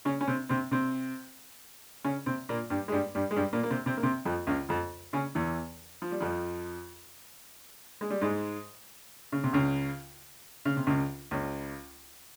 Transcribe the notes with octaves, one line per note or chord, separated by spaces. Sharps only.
C#3 C#4
C#4
C3 C4
C3 C4
C3 C4
C#3 C#4
C3 C4
A#2 A#3
G2 G3
G#3
G2 G3
G2 G3
G#3
G2 G3
A#2 A#3
A#3
C3 C4
C3 C4
A#3
C3 C4
F2 F3
C#2 C#3
F2 F3
C#3 C#4
E2 E3
F3
G3
F2 F3
G#3
G3
G#2 G#3
C#3
C3
C#2 C#3
C#3
C3
C#2 C#3
C#2 C#3